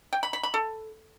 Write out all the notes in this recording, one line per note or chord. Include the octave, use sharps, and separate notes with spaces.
G5
B5
B5
B5
A4